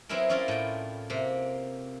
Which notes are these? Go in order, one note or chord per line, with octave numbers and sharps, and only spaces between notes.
F#3 B3 C4 E4 G#4 A#4
C#4 E4 F4 A#4 D5
A2 G5
C3 A#3